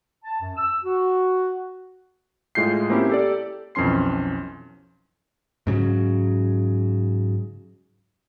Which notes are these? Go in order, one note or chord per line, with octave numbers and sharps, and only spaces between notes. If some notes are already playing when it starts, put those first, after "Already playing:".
A5
F#2
E6
F#4
A2 G#3 F4 G6 C7
A#3 C4 C#4 E4 G4
G4 A4 D5
B1 F2 E3 C#4 C6 C7
G#2 C#3 F#3